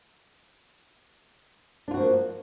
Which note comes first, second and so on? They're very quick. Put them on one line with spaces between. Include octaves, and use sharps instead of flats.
D4 F4 F#4 F3 A#3